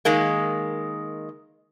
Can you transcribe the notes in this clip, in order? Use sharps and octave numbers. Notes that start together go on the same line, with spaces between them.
D#3 G#3 A#3